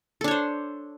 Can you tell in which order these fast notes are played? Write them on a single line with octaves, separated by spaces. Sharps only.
A4 D4 C#5 C5